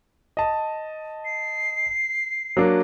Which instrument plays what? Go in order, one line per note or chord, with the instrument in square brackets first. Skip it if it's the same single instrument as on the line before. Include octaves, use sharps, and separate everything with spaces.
[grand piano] D#5 A5
[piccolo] C7
[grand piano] F#3 A#3 D4